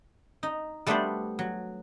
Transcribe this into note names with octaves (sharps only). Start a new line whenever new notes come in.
D#4
G3 A3 B3 D4 C5 D5
F#3